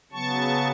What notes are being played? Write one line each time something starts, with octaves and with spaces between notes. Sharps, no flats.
C#3 F#3 B3 A5 C#6